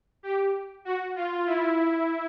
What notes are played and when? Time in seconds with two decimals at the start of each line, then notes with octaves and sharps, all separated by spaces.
0.23 G4
0.85 F#4
1.16 F4
1.46 E4